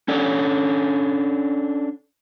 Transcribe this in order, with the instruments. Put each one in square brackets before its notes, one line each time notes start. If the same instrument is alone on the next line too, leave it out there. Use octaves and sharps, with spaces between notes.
[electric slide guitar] C#4 D4 A4 C#5 D5